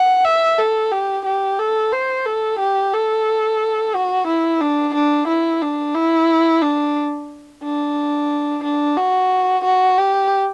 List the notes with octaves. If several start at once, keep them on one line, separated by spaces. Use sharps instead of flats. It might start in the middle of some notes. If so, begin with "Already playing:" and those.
Already playing: F#5
E5
A4
G4
G4
A4
C5
A4
G4
A4
F#4
E4
D4
D4
E4
D4
E4
D4
D4
D4
F#4
F#4
G4